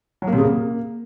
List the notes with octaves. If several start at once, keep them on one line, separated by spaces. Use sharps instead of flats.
F#3
A#3
C3
C#3
A#3